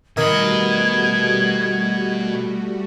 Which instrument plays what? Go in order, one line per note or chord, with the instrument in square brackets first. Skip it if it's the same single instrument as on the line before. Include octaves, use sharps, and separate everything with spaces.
[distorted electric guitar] B2 B5 [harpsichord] D#3 [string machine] G3 A3 F#4 [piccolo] G#6